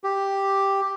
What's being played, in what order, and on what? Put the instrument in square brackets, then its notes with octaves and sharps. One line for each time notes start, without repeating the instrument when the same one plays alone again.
[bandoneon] G4